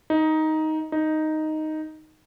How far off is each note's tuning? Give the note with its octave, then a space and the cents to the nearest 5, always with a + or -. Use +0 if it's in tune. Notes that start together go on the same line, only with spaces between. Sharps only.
D#4 +10
D#4 +0